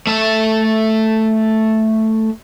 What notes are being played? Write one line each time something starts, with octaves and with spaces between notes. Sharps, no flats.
A3 E5